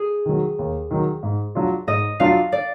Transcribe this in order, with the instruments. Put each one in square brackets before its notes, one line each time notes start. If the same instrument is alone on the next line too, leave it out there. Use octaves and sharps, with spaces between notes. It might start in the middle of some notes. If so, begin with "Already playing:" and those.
Already playing: [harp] G#4
[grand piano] D#3 F#3
D#2
D#3 F#3
G#2
F#3 D4 F4
[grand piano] G#2 [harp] D#5
[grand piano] F#3 D4 F4 [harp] F5
[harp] D5